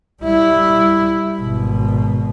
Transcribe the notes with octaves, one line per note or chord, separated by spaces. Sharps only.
G3 E4
G#1 B2